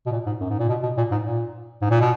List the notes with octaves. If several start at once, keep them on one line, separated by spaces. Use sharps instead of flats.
B2
A#2
G#2
F#2
G#2
A#2
B2
B2
A#2
G#2
A#2
G#2
A#2
B2